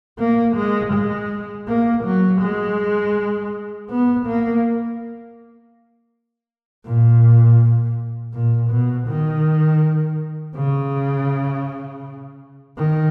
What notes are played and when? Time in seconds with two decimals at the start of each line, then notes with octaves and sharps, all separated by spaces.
0.19 A#3
0.56 G#3
0.93 G#3
1.68 A#3
2.04 F#3
2.42 G#3
3.90 B3
4.26 A#3
6.85 A#2
8.34 A#2
8.71 B2
9.08 D#3
10.56 C#3
12.78 D#3